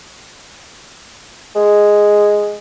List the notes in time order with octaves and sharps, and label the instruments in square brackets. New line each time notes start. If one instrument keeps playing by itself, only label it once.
[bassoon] G#3